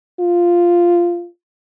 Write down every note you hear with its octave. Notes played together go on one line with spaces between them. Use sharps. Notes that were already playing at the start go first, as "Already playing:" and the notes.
F4